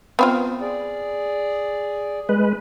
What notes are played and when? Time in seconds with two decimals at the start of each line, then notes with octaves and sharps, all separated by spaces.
0.19 B3 C4 F4
0.61 G#4 D5
2.29 G#3 B4